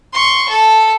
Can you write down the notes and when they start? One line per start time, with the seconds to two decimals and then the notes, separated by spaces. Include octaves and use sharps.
0.13 C6 C#6
0.49 A4